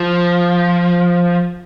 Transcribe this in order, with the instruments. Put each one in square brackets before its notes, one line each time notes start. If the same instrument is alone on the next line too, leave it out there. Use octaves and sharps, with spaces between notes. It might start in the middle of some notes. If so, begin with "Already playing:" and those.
Already playing: [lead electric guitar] F3